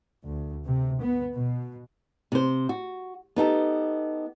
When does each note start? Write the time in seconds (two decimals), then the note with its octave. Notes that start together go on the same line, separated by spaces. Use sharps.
0.23 D2
0.66 C3
1.00 B3
1.35 B2
2.32 C3 C5
2.69 F#4
3.36 B3 D#4 G4 A4